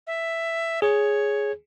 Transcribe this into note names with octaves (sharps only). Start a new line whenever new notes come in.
E5
G#4 C#5